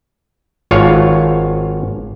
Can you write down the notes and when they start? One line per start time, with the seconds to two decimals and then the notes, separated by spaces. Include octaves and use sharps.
0.71 G#1 F4 C#5 F5